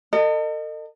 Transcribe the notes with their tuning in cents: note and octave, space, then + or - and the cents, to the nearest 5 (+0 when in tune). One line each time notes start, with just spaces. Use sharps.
A4 +45 D#5 -25